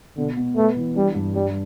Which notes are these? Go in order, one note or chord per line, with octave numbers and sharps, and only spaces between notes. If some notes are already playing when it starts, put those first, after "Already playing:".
B2 D3
B2
A3 B4
E3
G3 D4
G2
G3 D4